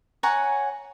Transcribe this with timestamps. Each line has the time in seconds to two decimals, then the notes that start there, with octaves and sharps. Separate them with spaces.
0.23 C#5 F#5 G#5 A#5